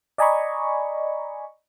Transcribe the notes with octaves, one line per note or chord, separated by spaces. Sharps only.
D5 D#5 G#5 A#5 B5 C#6